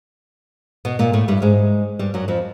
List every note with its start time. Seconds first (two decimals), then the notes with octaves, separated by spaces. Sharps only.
0.85 B2 B3
0.99 A#2 A#3
1.13 A2 A3
1.28 G2 G3
1.42 G#2 G#3
1.99 G2 G3
2.14 F#2 F#3
2.28 F2 F3